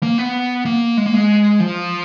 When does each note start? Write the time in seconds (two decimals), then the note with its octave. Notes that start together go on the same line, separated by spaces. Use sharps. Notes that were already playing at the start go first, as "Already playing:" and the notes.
0.03 A#3
0.18 B3
0.65 A#3
0.97 G#3
1.06 A#3
1.14 G#3
1.60 F3